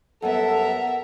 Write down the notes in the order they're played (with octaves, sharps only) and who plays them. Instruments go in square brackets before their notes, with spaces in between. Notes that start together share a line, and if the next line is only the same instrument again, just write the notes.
[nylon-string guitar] F#2 G3 B3 [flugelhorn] A4 [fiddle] A#4 E5 [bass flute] F#5